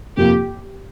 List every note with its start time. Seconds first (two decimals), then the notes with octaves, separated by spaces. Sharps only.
0.17 F2 C3 F3 A#3 G4